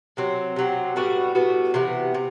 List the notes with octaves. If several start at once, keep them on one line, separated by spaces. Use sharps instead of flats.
C3 F#3 C4
C3 F#3 C4
A2 G3 B3 F#4
A2 G3 B3 F#4
C3 E3 B3
C3